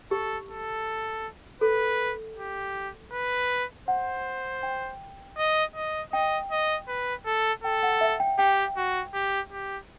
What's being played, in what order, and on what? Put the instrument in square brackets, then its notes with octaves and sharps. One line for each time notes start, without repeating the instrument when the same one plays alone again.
[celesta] G4 [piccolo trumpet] A4
[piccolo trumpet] A4
[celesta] A4 [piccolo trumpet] B4
[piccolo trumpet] G4
B4
[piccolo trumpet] C5 [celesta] F#5
[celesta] G5
[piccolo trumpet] D#5
D#5
[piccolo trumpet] D#5 [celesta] G5
[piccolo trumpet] D#5
B4
A4
[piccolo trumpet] A4 [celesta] G5
[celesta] F#5
E5
G5
[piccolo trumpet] G4 [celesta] G5
[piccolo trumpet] F#4
G4
G4